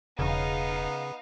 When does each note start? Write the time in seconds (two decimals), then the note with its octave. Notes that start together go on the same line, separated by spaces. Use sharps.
0.19 E1 C#3 B3 D#4 F5